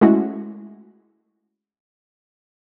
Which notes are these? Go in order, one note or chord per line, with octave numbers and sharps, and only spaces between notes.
G#3 A3 C#4 E4 F#4